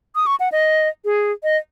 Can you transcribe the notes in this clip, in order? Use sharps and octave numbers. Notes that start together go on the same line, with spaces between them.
D#6
C#6
F#5
D#5
G#4
D#5